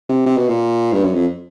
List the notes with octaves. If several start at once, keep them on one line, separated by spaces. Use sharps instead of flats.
C3
C3
B2
A#2
G2
F#2
F2